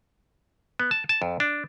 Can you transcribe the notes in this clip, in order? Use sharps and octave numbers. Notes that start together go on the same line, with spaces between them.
B3
A5
A5
F2
D4